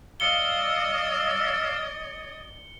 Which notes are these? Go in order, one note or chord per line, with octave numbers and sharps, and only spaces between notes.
D5 D#5 F5 E6 C#7 G7